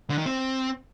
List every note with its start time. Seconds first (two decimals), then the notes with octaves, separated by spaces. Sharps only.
0.10 D3
0.18 D#3
0.26 C4